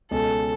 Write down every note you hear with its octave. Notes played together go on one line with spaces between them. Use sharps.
C#2 B2 G#3 C#4 A4